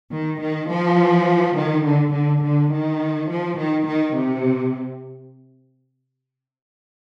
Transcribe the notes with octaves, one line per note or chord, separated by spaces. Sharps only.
D#3
D#3
F3
D#3
D3
D3
D3
D#3
F3
D#3
D#3
C3